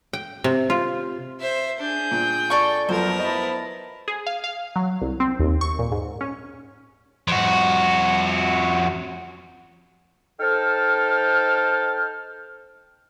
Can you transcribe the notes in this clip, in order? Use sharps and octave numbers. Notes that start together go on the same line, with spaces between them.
G5
C3
F4
C5 E5
D4 G#4 G6
A#2 G5
A4 D5 C#6
F#2 F3 A3 B3 A#4 C5
E4 D#5 A5
G#4
F5
F5
F#3
C2
C4
D#2
C#6
A#2
G#2
C#4
F2 F#4
D#4 A4 C5 G5 A5 F6